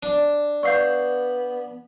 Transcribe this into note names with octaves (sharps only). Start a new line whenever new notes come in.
D4
B3 D5 F5 C#6 E6 G6 C7